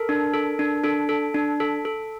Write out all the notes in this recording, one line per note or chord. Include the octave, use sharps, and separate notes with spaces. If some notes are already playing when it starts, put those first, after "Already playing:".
Already playing: A4 A#4
D4
A4
D4
D4 A4
A4
D4
A4
A4